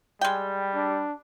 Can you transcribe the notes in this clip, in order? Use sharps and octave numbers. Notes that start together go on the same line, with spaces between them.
G3 G#3 G5
D4